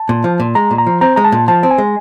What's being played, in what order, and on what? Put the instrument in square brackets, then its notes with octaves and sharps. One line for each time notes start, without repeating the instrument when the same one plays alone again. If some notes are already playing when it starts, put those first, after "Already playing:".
Already playing: [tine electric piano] A5
[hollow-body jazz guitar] A#2
F3
A#2
[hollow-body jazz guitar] G#3 [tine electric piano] A#5
[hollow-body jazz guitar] A#2
[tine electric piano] A#5
[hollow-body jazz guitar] F3
[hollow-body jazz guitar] C4 [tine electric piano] A#5
[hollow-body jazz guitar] G#3 [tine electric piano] A#5
[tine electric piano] A5
[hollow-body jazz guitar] A#2
[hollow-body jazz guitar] F3 [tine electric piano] A5
[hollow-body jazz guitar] C4
[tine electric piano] G#5
[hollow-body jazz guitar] G#3